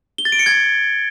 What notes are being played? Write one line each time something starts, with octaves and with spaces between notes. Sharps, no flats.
G7
A6
D7
C#7
G#6